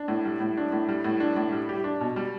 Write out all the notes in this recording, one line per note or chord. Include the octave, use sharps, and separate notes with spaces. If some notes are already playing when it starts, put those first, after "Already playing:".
Already playing: D4
A2
G3
A2
D4
A2
G3
A2
D4
A2
G3
G4
D4
B2
G3